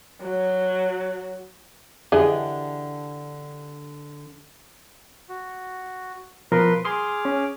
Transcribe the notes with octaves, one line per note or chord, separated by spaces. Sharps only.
F#3
D3 E3 D4 G4 G#4 D#5
F#4
B2 F3 A#4 B4 C6
G#4 C6 D6 D#6 F6
C#4